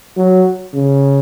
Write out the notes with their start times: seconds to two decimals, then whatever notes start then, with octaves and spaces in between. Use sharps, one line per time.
0.16 F#3
0.73 C#3